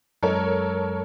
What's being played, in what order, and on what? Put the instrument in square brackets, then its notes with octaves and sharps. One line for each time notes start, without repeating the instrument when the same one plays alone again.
[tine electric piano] F#2 F#3 G#3 [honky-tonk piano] A4 A#4 C#5